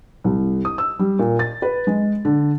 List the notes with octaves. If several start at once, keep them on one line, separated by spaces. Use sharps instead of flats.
C2
D#6
E6
G3
A#2
A6
B4
G#3
D3